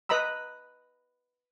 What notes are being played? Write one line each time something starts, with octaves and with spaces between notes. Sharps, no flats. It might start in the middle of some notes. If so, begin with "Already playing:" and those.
B4 D#5 A#5 B5 E6